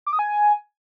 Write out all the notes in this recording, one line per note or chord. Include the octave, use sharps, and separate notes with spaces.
D6
D#6
G#5